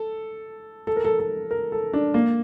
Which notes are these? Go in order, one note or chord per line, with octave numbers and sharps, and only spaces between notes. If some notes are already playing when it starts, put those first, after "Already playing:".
Already playing: A4
A4
A#4
A4
A4
A#4
A4
D4
A#3